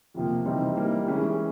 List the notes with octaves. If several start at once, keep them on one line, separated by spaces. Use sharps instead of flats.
F2 C3 F3 A#3
C3 E3 G3 C4 D#4
E3 G3 A#3 D#4
E3 G#3 C#4